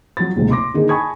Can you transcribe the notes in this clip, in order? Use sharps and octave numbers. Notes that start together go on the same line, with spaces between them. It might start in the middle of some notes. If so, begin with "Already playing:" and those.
F#3 F4 A6
F#1 D2 G#2 C3
C6 D6 A#6
D3 D#3 A#3 D#4 G#4
G#5 A5 B5 C#6 D#6 G#6